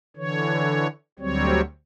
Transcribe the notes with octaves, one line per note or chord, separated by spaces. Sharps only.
D3 E3 C#5
D2 F#3 G3 C4 C#5